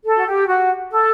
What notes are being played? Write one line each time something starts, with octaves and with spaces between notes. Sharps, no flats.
A4
F#4
G4
F#4
A4